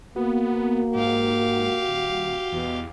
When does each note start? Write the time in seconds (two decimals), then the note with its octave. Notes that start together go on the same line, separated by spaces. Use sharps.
0.16 A#3 B3 F#4
0.95 G#2 G4 F5
1.88 D#1
2.52 E2 B2